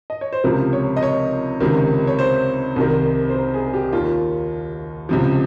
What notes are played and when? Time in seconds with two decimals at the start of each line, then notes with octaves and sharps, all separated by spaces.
0.10 D#5
0.21 C#5
0.33 C5
0.44 C#2 C3 F3 A#4
0.73 C#5
0.97 D#5
1.03 C#5
1.60 C#2 C3 D#3
2.07 C#5
2.19 C5
2.76 C2 C3 D#3
3.29 C5
3.34 A#4
3.54 G#4
3.74 G4
3.93 D#2 D#3 F4
5.09 C#2 C3 F3